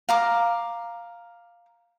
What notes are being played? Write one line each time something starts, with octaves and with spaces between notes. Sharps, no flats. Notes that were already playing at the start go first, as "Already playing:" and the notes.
F5 A#5 D6